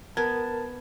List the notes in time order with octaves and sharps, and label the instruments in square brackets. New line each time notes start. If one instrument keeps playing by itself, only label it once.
[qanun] B3 [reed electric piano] A#4 [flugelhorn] A5 [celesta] G#6